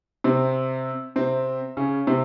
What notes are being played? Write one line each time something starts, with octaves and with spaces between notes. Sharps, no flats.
C3 C4
C3 C4
C#3 C#4
C3 C4